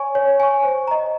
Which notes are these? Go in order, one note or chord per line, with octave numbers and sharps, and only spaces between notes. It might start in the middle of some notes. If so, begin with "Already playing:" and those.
Already playing: C#5 G#5 C#6
C#5
G#5 C#6
C5
D#5 A#5